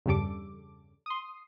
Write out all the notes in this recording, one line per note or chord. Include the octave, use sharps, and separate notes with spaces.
E2 G2 C#3 G3 A4 D6
C6 D#6